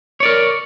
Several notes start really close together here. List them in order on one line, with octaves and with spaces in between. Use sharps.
C#5 D5 A#4